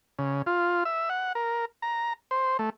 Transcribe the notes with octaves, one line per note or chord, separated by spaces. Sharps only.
C#3
F4
E5
F#5
A#4
A#5
C5
A3